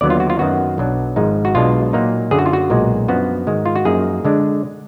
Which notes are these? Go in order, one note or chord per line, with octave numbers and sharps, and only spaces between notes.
D#2 D3 F#3 B3 D5
F4
F#4
F4
F#2 D#3 F#3 B3 F#4
B1 B2 F#3 D4
G#1 G#2 F3 G#3 D#4
F#4
B1 B2 G#3 D4 F4
A#2 F#3 A#3 D#4
F#2 D3 F#3 G#4
F#4
F4
F#4
B1 A#2 G#3 D#4
F#2 F3 B3 D4 F#4
G#2 D#3 G#3
F4
F#4
F#2 F3 A#3 D#4 G#4
D3 G#3 D4